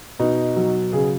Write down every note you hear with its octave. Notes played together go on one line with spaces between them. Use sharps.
B2 D#4
F#3
C#3 G#4